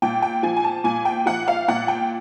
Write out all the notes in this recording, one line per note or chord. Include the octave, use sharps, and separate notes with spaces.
A#2 G5
G5
F3 G#5
G#5
A5
A#2 G#5
G5
F3 F#5
F5
A#2 F#5
G5